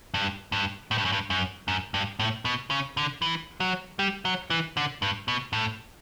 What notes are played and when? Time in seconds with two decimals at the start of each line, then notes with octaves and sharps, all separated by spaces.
0.14 G2
0.52 G2
0.91 A2
0.98 G2
1.05 F#2
1.12 G2
1.30 F#2
1.68 F#2
1.94 G2
2.19 A2
2.45 B2
2.70 C#3
2.97 D3
3.22 E3
3.60 F#3
3.99 G3
4.25 F#3
4.50 E3
4.77 D3
5.02 G2
5.28 B2
5.53 A2